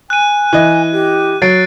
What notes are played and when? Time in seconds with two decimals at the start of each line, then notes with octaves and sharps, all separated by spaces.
0.10 G#5 F#6 D#7
0.53 E3 D#5
0.92 G4
1.42 F#3 A6 C7 D7